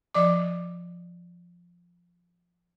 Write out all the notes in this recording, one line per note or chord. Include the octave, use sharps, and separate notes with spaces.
F3 D5 D6